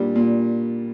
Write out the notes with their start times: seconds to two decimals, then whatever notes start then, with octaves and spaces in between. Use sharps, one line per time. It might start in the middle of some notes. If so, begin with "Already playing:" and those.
Already playing: A#2 G3 D4
0.15 A#2